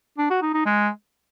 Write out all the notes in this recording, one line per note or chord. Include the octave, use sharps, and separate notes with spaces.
D4
F#4
D#4
D#4
G#3